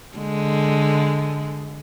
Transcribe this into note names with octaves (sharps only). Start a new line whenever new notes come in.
D3 G#3